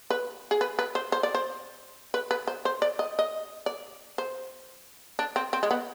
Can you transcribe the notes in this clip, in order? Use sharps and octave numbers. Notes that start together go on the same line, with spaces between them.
B4
G#4
B4
B4
C5
C5
D5
C5
B4
B4
C5
C5
D5
D#5
D#5
D5
C5
D4
C4
C4
G#3
B3